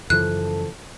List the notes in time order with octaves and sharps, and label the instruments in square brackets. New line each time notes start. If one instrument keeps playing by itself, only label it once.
[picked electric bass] F#2 [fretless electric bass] C#3 E3 F3 [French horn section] A4 [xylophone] F#6